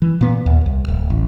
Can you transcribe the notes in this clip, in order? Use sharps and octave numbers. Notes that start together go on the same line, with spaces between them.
E3
A#2 B3
D#2
C2
D1
A1